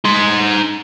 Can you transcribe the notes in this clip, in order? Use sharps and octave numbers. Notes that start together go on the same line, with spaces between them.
D#4 C6